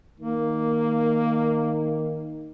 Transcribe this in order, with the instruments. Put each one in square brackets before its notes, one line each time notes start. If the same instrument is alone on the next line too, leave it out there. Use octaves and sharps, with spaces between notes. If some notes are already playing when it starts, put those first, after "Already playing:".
[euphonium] D#3 [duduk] A#3